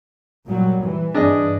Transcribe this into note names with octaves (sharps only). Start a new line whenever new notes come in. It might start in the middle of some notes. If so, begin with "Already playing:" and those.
A#2 F#3 G3
E3
G2 E3 D4 G#4 D#5